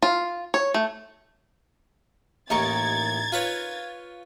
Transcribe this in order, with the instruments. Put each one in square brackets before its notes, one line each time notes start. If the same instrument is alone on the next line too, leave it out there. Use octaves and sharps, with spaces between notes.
[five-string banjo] F4
C#5
A3
[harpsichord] A1 D#2 [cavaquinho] D#4 A#4 C#6 [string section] G#6 A6
[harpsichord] F4 B4 C#5